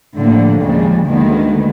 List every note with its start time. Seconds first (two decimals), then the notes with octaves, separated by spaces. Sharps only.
0.17 A2 D3 F3 G3 A#3
0.62 D#2 C#3 F3 G3 G#3
1.07 D2 D3 D#3 G#3 A#3 B3